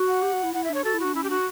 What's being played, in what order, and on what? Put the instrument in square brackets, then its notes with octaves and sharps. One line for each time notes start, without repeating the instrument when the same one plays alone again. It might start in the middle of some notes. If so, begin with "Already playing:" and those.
Already playing: [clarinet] F#4
[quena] F#5
[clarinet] G4
F#4
E4
[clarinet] E4 [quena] F#5
[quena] E5
[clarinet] D4 [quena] C#5
[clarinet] F#4 [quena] A4
[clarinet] E4
[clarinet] D4 [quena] F#4
[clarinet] C#4 [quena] E4
[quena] G4
[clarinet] D4 [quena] F#4